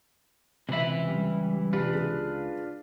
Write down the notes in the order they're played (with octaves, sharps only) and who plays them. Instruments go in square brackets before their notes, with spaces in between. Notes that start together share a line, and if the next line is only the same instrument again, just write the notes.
[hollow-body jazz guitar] C#2 E5 [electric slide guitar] C3 [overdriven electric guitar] E3 B5
[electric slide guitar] G3
[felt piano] C3 [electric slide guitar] D4 F4 B4
[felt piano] G#4